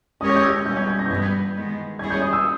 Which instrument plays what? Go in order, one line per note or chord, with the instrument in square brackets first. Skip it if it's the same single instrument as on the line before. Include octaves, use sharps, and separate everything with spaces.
[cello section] G#3 C#4 G4 A#4 C#5 [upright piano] D#6
[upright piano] G#6
G6
E6
[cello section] B2 G3 C#4 [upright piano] G6
[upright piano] G#6
G6
A#6
G6
[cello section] G2 E3 G3 B3 [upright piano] G#6
[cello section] D#3 G#3 B3
[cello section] G3 C#4 E4 G#4 C#5 [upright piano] G#6
[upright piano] G6
D#6
E6